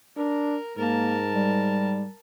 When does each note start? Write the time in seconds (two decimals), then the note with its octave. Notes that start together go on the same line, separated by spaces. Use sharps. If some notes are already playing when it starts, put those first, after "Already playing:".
0.17 D4 A#4
0.78 G#2 A#3 A#4 A5
1.32 G3